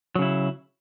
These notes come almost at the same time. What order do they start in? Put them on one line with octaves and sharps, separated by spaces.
F#3 C#3 E4